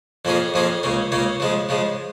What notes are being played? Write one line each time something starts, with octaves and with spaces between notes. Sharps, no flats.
F2 F3 A#3 C#4 G#4
F2 F3 A#3 C#4 G#4
C#2 C#3 A#3 C#4
C#2 C#3 A#3 C#4
C#3 F3 G#3
C#3 F3 G#3